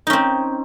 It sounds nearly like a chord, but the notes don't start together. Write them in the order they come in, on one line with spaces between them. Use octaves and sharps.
D#4 C#4 C4